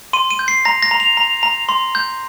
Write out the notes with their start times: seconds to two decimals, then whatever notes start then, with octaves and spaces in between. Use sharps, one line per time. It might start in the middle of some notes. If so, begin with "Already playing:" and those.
0.13 C6 D#7
0.31 D#7
0.39 G6
0.48 C7
0.65 A#5 A#6
0.82 A#6
0.91 A#5
1.00 F7
1.17 A#5
1.43 A#5
1.69 C6
1.95 G6